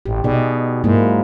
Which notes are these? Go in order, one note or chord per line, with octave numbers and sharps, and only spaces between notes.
A1 G4
B2 D#4 G#4 D5
G#2 F#3 A#3 E4